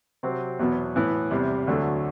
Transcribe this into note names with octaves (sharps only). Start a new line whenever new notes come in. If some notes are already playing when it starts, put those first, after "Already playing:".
C3 F#3 C4 F#4
E2 B2 F#3 B3 F#4
A2 E3 B3 E4
E2 C3 G3
D2 D3 F#3 A3